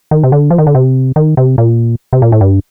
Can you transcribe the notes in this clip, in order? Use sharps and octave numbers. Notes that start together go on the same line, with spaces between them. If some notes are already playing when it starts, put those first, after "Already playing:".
D#3
C3
D3
F3
D#3
D3
C3
D#3
C3
A#2
C3
A#2
A2
G2